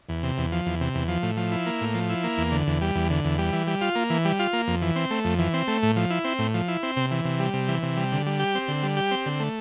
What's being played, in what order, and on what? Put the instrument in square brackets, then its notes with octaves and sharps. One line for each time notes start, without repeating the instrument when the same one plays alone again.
[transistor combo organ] E2
C3
E2
F3
E2
C3
E2
F3
A2
F3
E4
A#3
A2
F3
E4
A#3
E2
D3
E2
G3
E2
D3
E2
G3
E3
G3
F4
A#3
E3
G3
F4
A#3
F2
E3
C4
A3
F2
E3
C4
A3
A2
F3
E4
C4
A2
F3
E4
C4
C3
E3
C3
G3
C3
E3
C3
G3
D3
G3
G4
C4
D3
G3
G4
C4
D3
A3